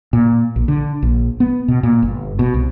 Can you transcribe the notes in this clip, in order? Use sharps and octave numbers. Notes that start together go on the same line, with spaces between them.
A#2
A#1
D3
A#1
B3
B2
A#2
G1
B2
C2